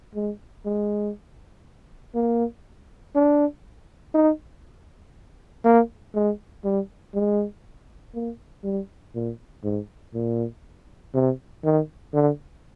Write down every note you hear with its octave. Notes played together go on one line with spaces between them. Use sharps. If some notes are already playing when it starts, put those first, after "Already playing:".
G#3
G#3
A#3
D4
D#4
A#3
G#3
G3
G#3
A#3
G3
A#2
G#2
A#2
C3
D#3
D3